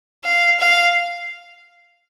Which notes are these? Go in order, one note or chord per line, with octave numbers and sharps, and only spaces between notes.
F5
F5